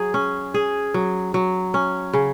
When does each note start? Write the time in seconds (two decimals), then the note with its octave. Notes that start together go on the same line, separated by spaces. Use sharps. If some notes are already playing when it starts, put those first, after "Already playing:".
Already playing: F#3 G#4
0.14 C#4
0.54 G#4
0.94 F#3
1.34 F#3
1.74 C#4
2.13 C#3